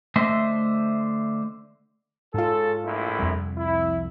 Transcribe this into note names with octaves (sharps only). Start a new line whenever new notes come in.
D3 A3 C5 D#5 E5
G#2 C#3 F4 A4
A#1 A3 E4
C2 F2
E4